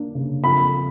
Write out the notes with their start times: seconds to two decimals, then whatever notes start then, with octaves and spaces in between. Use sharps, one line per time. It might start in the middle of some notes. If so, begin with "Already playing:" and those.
Already playing: A#3 D4
0.15 C#3
0.43 F2 B5